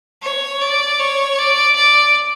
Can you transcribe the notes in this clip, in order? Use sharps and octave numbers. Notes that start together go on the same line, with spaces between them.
C#5
D5
C#5
D5
D5